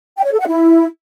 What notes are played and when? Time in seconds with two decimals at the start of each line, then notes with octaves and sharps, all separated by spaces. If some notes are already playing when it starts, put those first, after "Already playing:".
0.17 G5
0.24 C#5
0.32 A4
0.40 F#5
0.47 E4